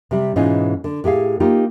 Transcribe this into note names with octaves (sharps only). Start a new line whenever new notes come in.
C3 G3
G#2 B2 E3 C#4 D#4 F4
D3
A2 G4 G#4 F5
A#3 D#4 F4 G4